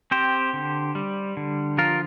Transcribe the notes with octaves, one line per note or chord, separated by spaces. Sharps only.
C4 G4 C5
D3
G3
D3
F3 F4 A#4